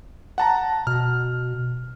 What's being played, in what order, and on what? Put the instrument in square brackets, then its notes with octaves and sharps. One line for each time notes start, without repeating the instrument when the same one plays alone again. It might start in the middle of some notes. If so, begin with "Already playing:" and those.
[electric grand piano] F#5 A5 A#5
[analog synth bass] B2 [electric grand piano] F6